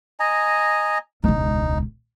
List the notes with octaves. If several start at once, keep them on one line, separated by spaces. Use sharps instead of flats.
D#5 G#5 A#5
E1 C#2 D#4